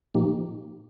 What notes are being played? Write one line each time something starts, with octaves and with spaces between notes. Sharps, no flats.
A#2 F3 A#3 D#4 G4